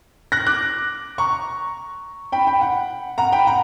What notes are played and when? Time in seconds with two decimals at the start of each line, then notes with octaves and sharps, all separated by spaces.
0.32 F#6 A#6
0.46 D6 F#6
1.18 A#5 C#6
2.32 G5 B5
2.47 G5 B5
2.61 F#5
3.18 F#5 A#5
3.32 G5 B5
3.47 F#5 A#5